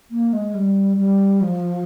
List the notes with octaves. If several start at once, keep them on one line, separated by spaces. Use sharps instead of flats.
A#3
G#3
G3
G3
F3